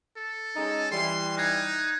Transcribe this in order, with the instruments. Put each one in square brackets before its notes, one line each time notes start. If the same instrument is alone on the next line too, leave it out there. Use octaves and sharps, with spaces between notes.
[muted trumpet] A4
[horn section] G#3 C#4 D#4
[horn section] E3 G3 [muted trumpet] C6
[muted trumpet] D#4 [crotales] F#6 G#6